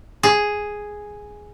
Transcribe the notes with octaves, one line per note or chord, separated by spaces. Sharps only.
G#4